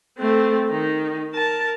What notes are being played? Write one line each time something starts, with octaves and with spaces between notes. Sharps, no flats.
A3 C4
D#3 D#4
A#4 A5